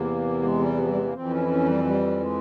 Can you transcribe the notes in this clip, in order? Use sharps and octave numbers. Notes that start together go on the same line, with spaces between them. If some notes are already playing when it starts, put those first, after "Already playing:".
Already playing: E2 C3 E3 A#3
G#3
G3
F3
G3
G#3
A#3
F2 E3 C4
C#4
E4
C#4
G3
G3
G#3